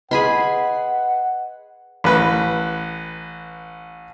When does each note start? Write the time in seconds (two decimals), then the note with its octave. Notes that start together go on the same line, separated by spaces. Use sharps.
0.11 G#4 B4 D#5 F#5 B5 C6
2.04 A1 B4